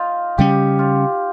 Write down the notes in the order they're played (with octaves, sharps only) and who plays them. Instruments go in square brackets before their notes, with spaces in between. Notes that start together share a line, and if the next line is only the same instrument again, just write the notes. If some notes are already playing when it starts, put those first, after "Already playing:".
Already playing: [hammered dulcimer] D#4 F4
[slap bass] C#3 G3 C#4 [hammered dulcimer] G4
[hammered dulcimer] F4